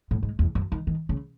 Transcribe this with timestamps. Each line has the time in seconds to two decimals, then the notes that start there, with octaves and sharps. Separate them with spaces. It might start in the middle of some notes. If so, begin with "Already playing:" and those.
0.11 A2
0.23 G#2
0.39 E2
0.55 F#2
0.72 D#3
0.87 D#3
1.09 C#3